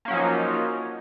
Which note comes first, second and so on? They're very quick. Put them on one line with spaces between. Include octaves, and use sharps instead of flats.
A#3 C#4 F#3 F3 D#4